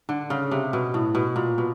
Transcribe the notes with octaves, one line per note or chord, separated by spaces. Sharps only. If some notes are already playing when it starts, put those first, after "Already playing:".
D3
C#3
C3
B2
A2
B2
A#2
B2